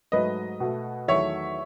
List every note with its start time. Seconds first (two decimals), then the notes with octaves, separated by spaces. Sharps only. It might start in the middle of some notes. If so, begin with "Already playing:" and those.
0.12 G#2 F#3 A3 B4 D#5
0.60 B2 A3
1.08 E2 D#3 F#3 A3 C#5 E5